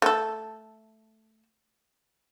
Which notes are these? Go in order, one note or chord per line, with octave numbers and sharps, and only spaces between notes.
A3 A4